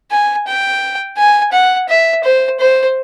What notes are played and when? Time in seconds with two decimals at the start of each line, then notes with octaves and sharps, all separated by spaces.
0.11 G#5
0.47 G5
1.17 G#5
1.52 F#5
1.89 E5
2.24 C5
2.60 C5